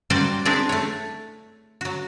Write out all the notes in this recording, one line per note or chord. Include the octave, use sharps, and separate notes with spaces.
G3 A#3 C#4 F#4 C5 D5
C4 D4 E4 G#4 A#4 D5
A3 C#5
F#3 F#4